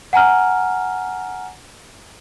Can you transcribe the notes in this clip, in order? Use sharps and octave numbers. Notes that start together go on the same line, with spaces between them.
F#5 G#5 A#5 F6